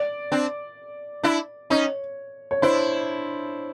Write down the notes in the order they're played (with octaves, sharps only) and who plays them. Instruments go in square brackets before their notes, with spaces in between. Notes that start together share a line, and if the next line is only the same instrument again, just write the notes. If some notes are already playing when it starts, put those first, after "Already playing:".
Already playing: [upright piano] D5
[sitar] C4 D4
D4 E4
[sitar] C#4 D#4 [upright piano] C#5
[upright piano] C#5
[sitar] D4 E4 [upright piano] C5